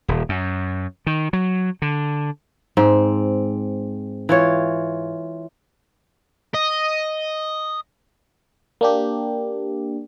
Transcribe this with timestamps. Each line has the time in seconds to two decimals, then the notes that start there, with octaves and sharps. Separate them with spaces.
0.08 D#1
0.29 F#2
1.07 D#3
1.33 F#3
1.82 D3
2.77 G#2 C4
4.29 E3 F4 C#5
6.54 D#5
8.81 A#3 D4 G4